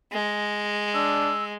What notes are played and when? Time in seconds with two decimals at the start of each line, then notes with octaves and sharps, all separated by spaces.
0.12 G#3
0.94 D4 E6